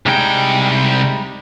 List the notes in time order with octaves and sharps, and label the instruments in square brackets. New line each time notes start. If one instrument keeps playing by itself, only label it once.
[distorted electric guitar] C2 G5 [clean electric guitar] G3 G#3 D#4